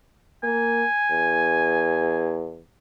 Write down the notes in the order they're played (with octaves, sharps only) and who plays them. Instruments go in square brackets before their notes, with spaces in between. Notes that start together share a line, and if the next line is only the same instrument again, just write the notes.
[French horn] A#3 [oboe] G#5
[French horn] E2